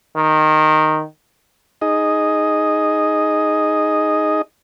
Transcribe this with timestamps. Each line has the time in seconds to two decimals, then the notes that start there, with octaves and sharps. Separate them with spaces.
0.16 D#3
1.82 D#4 G#4 D#5